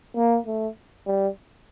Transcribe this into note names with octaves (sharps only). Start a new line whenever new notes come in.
A#3
A3
G3